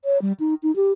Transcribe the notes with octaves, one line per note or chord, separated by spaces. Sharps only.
C#5
G3
D#4
D#4
G4